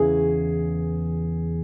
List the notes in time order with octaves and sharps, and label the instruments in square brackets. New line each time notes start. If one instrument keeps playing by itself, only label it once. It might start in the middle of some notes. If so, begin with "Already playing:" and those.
Already playing: [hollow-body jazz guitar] E2 C#3 E3 [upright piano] G#4